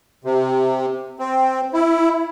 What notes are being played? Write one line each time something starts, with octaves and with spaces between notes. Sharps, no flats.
C3
C4
E4